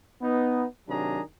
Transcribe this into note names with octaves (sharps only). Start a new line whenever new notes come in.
B3 D#4
C3 D#3 F#3 D4 G#4 A#5